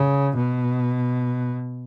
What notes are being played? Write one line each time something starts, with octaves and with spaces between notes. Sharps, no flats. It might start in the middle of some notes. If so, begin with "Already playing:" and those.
Already playing: C#3
B2